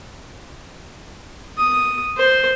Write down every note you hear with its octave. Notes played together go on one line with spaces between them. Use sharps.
D#6
C5